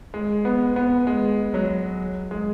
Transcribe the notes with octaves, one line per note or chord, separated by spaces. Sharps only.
G#3
B3
B3
G#3
F#3
G#3